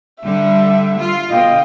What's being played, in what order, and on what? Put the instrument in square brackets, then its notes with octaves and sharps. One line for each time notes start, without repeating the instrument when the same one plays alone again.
[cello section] D3 G3 [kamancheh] E5
[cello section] F4
[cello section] B2 D3 [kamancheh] D#5 G5 [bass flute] F5